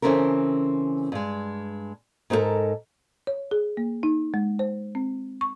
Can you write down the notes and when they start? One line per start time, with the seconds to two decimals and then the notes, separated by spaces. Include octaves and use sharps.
0.02 C#3 E3 C4 C#4 A4 A#4
1.12 G2 G#3
2.30 G#2 B3 D#4 E4 A4 A#4
3.27 C#5
3.51 G#4
3.77 A#3
4.03 D#4
4.34 G#3
4.59 C5
4.95 C4
5.41 C#6